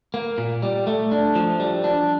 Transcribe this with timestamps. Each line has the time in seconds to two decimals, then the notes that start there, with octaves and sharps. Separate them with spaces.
0.14 A#3
0.38 A#2
0.62 G3
0.87 A3
1.12 D4
1.35 F3
1.60 G3
1.84 D4